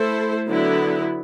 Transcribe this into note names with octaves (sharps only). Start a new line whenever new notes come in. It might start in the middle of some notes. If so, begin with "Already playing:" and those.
Already playing: A3 E4 A4 C5
D3 F#3 B3 E4